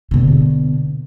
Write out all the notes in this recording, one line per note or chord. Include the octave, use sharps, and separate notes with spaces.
B2 D3